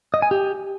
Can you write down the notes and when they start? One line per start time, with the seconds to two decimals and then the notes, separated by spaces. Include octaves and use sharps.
0.14 D#5
0.22 G#5
0.31 G4